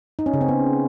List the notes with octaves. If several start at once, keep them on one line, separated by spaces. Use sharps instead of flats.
D#4
C#4
C#3
C4
B3